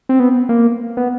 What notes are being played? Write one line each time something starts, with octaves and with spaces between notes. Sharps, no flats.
C4
B3
A#3
B3